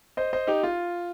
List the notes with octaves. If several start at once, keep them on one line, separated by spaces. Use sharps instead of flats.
C5 D#5
C5 D#5
D#4 G4
F4